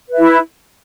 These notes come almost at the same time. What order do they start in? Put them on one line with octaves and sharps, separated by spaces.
B4 E5 E4